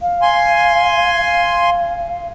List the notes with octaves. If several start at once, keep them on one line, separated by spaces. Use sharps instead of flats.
F5
G#5 C6
F5